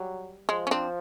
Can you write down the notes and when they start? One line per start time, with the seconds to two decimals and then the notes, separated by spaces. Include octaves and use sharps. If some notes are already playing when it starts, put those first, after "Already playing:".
Already playing: F#3 G3
0.49 F3 G#3
0.67 C#4
0.71 C4 D4